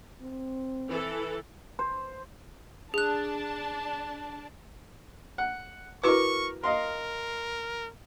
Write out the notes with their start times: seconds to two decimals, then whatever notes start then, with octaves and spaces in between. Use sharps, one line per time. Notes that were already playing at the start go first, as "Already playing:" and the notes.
0.22 C4
0.89 E3 A4
1.79 C5
2.94 D4 G#4 A5 F#6
5.38 F#5
6.04 E4 F#4 A#4 B4 C#6 D6
6.64 A#4 D#5 F5 C6